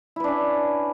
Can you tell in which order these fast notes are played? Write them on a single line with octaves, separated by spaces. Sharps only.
E4 B4 D4 C#4